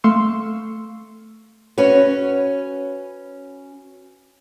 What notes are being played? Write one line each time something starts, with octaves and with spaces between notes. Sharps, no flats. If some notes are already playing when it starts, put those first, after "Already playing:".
A3 F5 C6 C#6 E6
C#4 F#4 B4 C#5